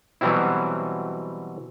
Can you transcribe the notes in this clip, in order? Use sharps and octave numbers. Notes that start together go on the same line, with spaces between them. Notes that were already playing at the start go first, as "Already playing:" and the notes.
B2 E3 F#3 G3 C4 E4